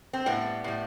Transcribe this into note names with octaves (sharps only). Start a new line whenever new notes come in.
C4
A2 G3 B3
A2 G3